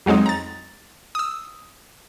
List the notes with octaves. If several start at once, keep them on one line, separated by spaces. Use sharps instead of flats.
F2 F#3 G#3 C4 D#4
A#5 A6
D#6 E6